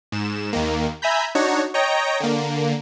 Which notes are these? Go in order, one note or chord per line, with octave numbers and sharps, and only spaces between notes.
G#2 E7
D#2 D#3 A#3
E5 G#5 A#5 B5 G6
D4 D#4 F#4 C#5
C#5 D#5 G5 A#5
D3 A#3